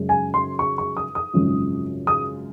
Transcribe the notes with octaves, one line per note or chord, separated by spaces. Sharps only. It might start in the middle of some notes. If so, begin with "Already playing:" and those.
Already playing: F#2 C#3 G#3
G#5
C6
C#6
C#6
D#6
D#6
G#1 F#2 C#3 F3 G#3
D#6